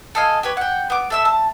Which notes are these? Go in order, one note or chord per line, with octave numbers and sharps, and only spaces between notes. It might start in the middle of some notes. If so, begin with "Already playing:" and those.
A4 D#5 F5 G#5
G4 B4 C#5
F#5 G5
B3 D6
A4 E5 E6
A5